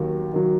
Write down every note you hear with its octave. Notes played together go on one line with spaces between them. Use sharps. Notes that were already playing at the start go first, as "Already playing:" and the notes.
Already playing: D#2 D#3 F#3
D#3 F#3